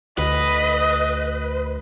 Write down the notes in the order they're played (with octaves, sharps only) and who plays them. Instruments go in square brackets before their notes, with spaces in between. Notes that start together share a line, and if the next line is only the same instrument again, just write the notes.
[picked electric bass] D2 [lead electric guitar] B4 [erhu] D#5